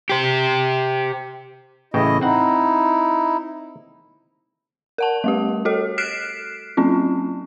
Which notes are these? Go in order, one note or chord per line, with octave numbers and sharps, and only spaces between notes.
G4 C5
A1 C#3 E4 D#5 G5
C4 D#4 E4 F#5
A#4 F#5 A5
G3 A3 G4
F#4 A4 D#5
F6 F#6 B6 C7 D7 E7
F#3 C4 C#4 F4